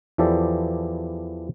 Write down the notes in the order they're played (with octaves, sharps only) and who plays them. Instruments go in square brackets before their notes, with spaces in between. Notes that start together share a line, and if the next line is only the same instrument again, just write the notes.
[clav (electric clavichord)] E2 E3 F3 G4 A4 D5